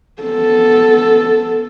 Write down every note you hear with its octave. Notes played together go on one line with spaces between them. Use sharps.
B3 A4